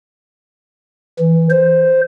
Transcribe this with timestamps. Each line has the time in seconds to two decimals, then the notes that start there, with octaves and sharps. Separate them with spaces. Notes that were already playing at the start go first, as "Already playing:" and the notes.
1.19 E3
1.50 C5